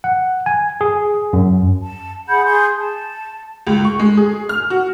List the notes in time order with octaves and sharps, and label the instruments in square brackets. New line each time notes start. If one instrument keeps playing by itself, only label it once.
[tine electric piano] F#5
G#5
G#4
F#2
[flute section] A5
G#4 F#5 B5 G6
G#4 C6 G6
A5
[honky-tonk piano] C#2
C#6
G#3
G#4
F6
F#4